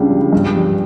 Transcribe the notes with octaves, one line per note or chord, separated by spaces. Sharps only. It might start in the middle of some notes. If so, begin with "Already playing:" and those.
Already playing: C#2 C#3 G3 D4
G3
G2
G3